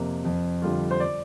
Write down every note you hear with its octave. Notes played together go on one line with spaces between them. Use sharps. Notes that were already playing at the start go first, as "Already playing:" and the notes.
Already playing: F2 C3 A#3
F2
D3 G3 C4 F4
C5
D5